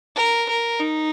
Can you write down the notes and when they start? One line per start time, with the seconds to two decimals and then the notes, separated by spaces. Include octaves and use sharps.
0.16 A#4
0.49 A#4
0.80 D#4